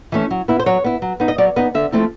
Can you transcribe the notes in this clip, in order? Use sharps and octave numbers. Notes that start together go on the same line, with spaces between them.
E3 A3 C#4
F#3
B3 E4
C5
F#3 C#5
B3 E4
F#3
B3 D#4
D#5
F#3 D5
B3 D#4 D#5
D3 E5
F3 A3 C4 E4